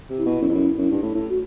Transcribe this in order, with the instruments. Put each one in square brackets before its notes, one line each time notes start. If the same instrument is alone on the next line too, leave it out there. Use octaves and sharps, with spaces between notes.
[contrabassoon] C3
[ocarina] E4
[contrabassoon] B2
F#2
F2
F#2
F#2
G2
A2
A2
[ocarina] F#4